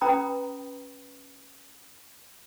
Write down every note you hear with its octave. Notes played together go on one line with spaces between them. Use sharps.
C#4 B4 G5 A#5 B5 D#6